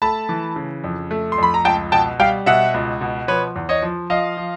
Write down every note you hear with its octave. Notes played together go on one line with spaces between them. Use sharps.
A3 A5 B5
E3
C#3
F2
A3
C6
F2 B5
A#5
C#2 G5 A5
B2 G5 A5
G3 F5 G5
B2 E5 F#5
C#2
B2
F3 B4 C#5
E2
C#5 D#5
F3
F3 D#5 F5
F3